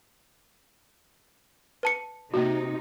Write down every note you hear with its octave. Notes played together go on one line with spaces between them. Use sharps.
B4 A5 C#7
C3 A#3 D#4 F#4